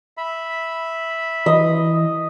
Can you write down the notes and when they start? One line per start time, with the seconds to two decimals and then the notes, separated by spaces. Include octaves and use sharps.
0.17 E5 B5
1.46 E3 D#5